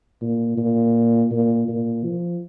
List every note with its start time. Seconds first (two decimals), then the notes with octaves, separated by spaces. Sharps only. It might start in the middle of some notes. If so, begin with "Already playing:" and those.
0.21 A#2
0.57 A#2
1.31 A#2
1.68 A#2
2.04 F3